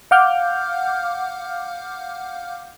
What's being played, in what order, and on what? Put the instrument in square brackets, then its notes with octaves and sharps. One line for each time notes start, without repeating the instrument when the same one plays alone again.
[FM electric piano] F5 F#5 D6 F6 G6